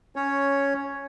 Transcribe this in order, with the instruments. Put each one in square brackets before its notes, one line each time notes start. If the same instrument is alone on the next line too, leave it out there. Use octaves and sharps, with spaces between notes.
[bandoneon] C#4 C#5